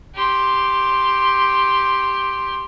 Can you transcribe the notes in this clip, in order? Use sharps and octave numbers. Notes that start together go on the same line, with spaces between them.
G4 C6